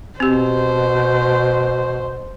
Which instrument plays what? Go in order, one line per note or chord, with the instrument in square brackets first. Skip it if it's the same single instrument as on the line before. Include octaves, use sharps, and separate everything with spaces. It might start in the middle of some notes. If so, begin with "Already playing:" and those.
[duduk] B2 [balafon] C4 G4 [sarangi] C5